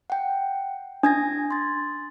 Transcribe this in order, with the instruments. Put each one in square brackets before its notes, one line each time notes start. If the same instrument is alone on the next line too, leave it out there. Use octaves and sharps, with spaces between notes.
[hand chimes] F#5 G5
[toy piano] D4 [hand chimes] D#6 G#6 A#6
[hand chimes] C6 A6